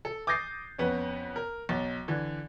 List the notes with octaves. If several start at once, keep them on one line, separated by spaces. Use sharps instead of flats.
A4
D6 D#6 G6 A6 A#6 C7
F2 B3 C#4
A#4
B1 A6
D3 E3